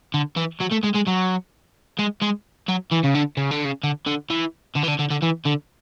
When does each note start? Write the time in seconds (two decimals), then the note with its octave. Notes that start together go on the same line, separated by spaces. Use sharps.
0.14 D3
0.36 E3
0.60 F#3
0.71 A3
0.83 G#3
0.94 G#3
1.07 F#3
1.99 G#3
2.22 G#3
2.68 F#3
2.91 E3
3.03 C#3
3.14 D3
3.37 C#3
3.51 D3
3.65 C#3
3.83 D3
4.06 D3
4.30 E3
4.76 D3
4.84 E3
4.88 D3
4.99 D3
5.11 D3
5.23 E3
5.46 D3